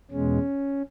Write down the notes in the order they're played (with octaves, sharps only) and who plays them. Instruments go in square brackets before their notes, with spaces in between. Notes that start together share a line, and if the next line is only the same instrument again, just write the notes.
[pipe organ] E2 B2 G#3 C#4